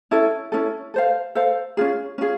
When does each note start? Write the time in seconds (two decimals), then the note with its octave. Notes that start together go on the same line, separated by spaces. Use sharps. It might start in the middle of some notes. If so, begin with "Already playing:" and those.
0.11 C#4 E4 A4
0.52 C#4 E4 A4
0.94 A4 C5 F5
1.35 A4 C5 F5
1.77 C#4 F4 G#4
2.18 C#4 F4 G#4